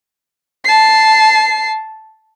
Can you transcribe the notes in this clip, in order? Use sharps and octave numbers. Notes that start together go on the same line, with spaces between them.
A5 C7